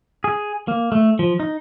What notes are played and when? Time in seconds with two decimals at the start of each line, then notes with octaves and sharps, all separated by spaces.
0.24 G#4
0.68 A#3
0.92 A3
1.19 F3
1.40 D#4